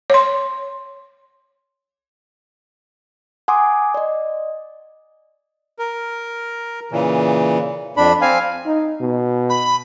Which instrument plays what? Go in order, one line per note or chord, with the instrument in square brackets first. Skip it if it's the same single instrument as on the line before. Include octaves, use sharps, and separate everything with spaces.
[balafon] C#5 C6
[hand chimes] F#5 G#5 C6 D6 D#6
D5 D#5
[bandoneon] A#4
A#2 C#3 E3
F2 D4 B5
C4 F5 G#5
[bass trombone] D#4
B2
[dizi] B5